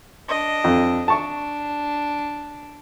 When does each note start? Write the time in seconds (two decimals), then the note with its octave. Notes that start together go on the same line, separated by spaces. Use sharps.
0.28 D4 D#5
0.64 F2
1.08 D4 A5 C#6